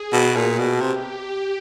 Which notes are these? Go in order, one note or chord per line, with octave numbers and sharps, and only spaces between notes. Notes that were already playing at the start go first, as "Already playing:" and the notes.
Already playing: G#4
B2
A#2
B2
C3 G4